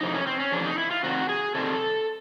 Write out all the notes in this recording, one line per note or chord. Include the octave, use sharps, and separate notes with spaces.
F2 C3 E3 D#4
C#4
C4
C#4
F2 C3 E3 D4
D#4
E4
F4
C3 D#3 G3 C4 F#4
G#4
C3 D#3 G3 C4 A4